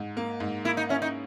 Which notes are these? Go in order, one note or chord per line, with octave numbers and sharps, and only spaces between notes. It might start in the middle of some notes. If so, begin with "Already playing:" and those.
Already playing: G#2
A#3
G#2
A#3 E4
D#4
C#4 E4
D#4